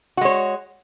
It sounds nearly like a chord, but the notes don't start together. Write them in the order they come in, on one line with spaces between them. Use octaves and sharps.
F#4 G#3 C#5